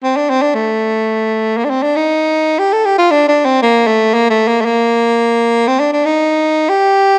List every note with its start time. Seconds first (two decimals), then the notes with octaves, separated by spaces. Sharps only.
0.03 C4
0.17 D4
0.30 C4
0.42 D4
0.55 A3
1.57 A#3
1.65 D4
1.70 C4
1.83 D4
1.96 D#4
2.59 G4
2.73 A4
2.85 G4
2.98 F4
3.11 D4
3.28 D4
3.45 C4
3.62 A#3
3.87 A3
4.14 A#3
4.30 A3
4.48 A#3
4.61 A3
4.65 A#3
5.68 C4
5.80 D4
5.92 D4
6.05 D#4
6.69 G4